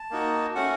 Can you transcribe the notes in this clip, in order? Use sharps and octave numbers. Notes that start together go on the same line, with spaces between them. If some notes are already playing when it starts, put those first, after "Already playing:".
Already playing: A5
A#3 D#4 F#4
A3 C#4 F#4 F#5